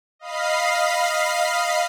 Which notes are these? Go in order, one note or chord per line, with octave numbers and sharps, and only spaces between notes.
D#5 F5 B5 C7